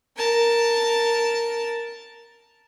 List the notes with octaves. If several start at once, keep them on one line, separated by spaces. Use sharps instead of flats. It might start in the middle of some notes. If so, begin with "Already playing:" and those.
A#4 A5